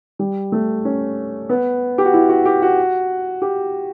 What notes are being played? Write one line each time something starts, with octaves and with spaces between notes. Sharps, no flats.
G3
A3
C#4
B3
G4
F#4
E4
F#4
G4
F#4
G4